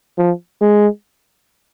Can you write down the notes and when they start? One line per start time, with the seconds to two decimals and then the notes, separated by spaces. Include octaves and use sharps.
0.18 F3
0.61 G#3